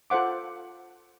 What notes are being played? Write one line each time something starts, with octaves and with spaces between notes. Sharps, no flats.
F4 A4 C5 F#5 D6